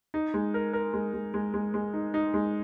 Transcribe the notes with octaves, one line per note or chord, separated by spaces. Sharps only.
D#4
G#3
A#4
A#4
G#3
G#3
G#3
G#3
G#3
D#4
D#4
G#3